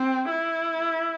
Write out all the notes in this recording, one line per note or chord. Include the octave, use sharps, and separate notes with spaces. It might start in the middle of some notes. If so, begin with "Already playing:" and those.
Already playing: C4
E4